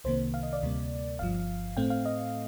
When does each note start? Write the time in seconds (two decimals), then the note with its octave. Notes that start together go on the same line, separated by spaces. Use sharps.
0.04 C2 C3 D#3 A#3 C5
0.34 F5
0.43 D#5
0.53 D5
0.63 D2 C3 G3 A#3
1.19 G1 G2 F3 F5
1.77 A2 A3 C4 G5
1.90 F5
2.05 D#5